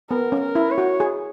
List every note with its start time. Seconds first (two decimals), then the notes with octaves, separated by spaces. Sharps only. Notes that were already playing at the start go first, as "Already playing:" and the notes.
0.10 B3 A#4
0.32 C#4
0.40 A#4
0.55 E4
0.71 C#5
0.78 F#4
1.00 G#4